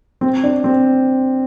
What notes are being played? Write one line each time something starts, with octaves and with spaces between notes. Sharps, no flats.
C4
D4
C4